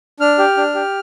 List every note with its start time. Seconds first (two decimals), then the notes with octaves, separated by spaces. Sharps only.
0.20 D4 F6
0.39 G4
0.57 D4
0.75 G4